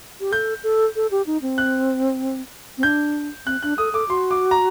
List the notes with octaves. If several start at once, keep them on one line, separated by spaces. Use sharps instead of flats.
G4
A4 G6
A4
A4
G4
D#4
C4
F#6
C4
D4 G6
C4 F#6
D4 F#6
A4 D#6
A4 D6
F#4 C6
D6
A#5